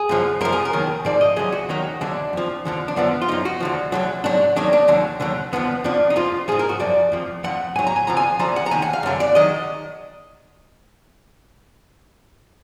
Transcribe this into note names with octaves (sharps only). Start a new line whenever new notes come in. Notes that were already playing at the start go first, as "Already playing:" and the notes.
Already playing: G#4
F#2 D3 F3
F#2 F3 A#4
G#4
A#4
D#2 D#3 F#3
G#2 F3 D5
D#5
D2 D3 F#3 G#4
F#4
D#2 D#3 F#3 D#4
D2 D3 F#3 D4
F2 F3
D#2 D3 F3
D4
F#2 D3 F3 B3
F4
F#2 F3 D#4
F#4
D2 D3 F3
D2 D3 F#3
G#2 F#3 D4
D#2 D#3 F#3 D4
D4
D#2 D3 F#3
D#2 D3 F#3
D#2 D3 F3 B3
F2 F3 D4
D#4
F2 F3 F4
G#2 F3 G#4
A#4
F#4
F#2 F3 D5
F2 F3
F2 F3 F#5
G#2 F#3 G#5
A#5
G#5
F2 D3 F3 A#5
G#5
D2 D3 F3 A#5
F#5
A#5
D#2 D#3 G#5
F#5
F5
F#2 D3 F#3
D5
D#3 F#3 D#5